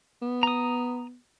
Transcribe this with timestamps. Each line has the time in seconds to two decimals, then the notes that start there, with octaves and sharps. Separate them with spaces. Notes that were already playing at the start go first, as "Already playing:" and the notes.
0.22 B3
0.43 A#5 D#6